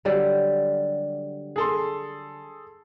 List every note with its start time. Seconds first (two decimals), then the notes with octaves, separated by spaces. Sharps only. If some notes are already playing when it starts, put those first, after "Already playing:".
0.05 D3 F#3 G3
1.56 G#4 A4 C6